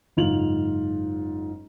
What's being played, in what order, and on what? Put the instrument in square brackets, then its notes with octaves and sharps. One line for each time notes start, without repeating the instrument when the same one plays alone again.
[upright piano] F#1 G#2 F4 F7 F#7